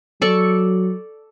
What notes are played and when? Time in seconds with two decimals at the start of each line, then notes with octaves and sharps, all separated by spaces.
0.22 F#3 A4 D5 C#6